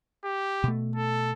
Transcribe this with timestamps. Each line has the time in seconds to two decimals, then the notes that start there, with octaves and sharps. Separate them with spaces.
0.25 G4
0.64 B2 A3
0.96 A4